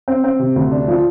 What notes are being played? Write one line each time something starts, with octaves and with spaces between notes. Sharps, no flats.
C4
C4
C3
D2
D4
F3